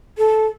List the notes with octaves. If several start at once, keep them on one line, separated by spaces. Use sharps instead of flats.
A4